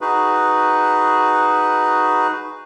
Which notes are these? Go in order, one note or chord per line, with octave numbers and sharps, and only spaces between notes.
D#4 F#4 G#4 B4